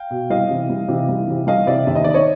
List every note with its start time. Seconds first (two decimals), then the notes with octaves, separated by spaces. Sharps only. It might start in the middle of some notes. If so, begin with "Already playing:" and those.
Already playing: F5 G5
0.10 B2
0.30 C2 D#5 F5
0.49 C3 E3
0.70 C2
0.88 C3 E3
1.09 C2
1.27 C3 E3
1.47 C2 D#5 F5
1.66 C3 E3 D5 E5
1.87 D#2 E5
1.95 D#5
2.04 D#3 D5
2.14 C#5 D#5